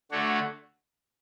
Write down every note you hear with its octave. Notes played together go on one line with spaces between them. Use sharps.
D3 A3 D4 F#4 C#5